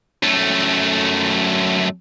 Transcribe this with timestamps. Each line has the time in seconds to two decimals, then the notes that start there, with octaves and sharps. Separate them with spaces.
0.23 F#2 A3